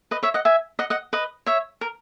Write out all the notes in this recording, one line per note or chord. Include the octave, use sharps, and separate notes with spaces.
B4 D#5
C#5 E5
D#5 F#5
E5 G#5
D#5 F#5
D#5 F#5
B4 D#5
C#5 E5
A#4